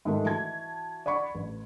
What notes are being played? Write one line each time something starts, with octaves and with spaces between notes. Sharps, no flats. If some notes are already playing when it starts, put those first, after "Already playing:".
G#2 D#3 G3 A3
E3 F#4 A5 G#6
D5 F#5 B5 C#6
A1